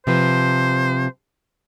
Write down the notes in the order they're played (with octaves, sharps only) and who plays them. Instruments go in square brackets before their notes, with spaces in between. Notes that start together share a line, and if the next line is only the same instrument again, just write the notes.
[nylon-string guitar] C3 F3 B4 [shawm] C5